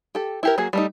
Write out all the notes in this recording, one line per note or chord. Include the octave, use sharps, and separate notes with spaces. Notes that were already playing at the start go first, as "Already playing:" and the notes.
G4 A4
E4 G4 A#4
F#3 A#3 F#4 G#4
G3 A3 D#4